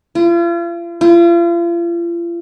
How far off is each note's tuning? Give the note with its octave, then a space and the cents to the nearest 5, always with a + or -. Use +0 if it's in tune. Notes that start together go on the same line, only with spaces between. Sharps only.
F4 -40
F4 -40